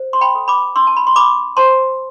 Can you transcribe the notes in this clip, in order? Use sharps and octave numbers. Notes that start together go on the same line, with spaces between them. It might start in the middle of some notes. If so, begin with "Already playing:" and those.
Already playing: C5
C6
G5 B5
A4
B5 D6
D4 C6 E6
A5
B5
C6
D4 B5 D6
C5 A5 C6